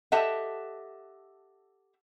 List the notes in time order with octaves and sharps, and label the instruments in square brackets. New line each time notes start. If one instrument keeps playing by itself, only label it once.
[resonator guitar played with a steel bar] G4 A4 D#5 E5 F#5